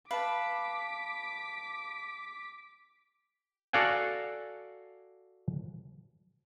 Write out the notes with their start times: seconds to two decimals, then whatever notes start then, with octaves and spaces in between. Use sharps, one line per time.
0.11 B4 F5 A5 D6 B6
3.73 F#4 A4 D5 F5 F#5 G#5